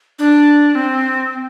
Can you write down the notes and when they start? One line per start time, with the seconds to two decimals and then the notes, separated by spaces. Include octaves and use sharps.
0.19 D4
0.75 C4